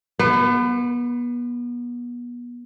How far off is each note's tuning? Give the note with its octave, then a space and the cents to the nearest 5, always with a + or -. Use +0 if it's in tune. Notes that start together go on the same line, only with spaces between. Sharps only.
B3 -30 B4 +30